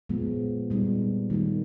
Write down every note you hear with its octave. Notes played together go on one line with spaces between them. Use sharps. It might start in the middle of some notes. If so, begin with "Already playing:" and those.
A#2 F3 G#3 B3
A#2 G3 B3 D#4
D#3 G3 A#3